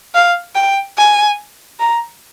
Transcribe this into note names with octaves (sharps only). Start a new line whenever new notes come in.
F5
G5
G#5
A#5